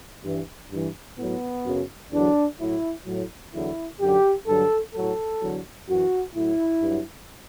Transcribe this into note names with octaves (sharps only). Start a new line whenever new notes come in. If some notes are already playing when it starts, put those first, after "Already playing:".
G2 E3
G2 E3
A2 F#3 B3
F#2 C#3 F#3
E2 D3 F#3 D4
A2 F#3 E4
A2 F#3
E2 D3 F#3 E4
F#2 D3 F#3 G4
G2 D3 F#3 A4
A2 F#3 A4
E2 D3 F#3
F#2 E3 F#4
A2 F#3 E4
G2 F#3